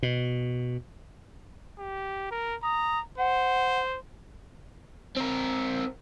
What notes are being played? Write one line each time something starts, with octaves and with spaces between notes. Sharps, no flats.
B2
G4
A#4
A#5 D#6
C5 F#5
C4 A#4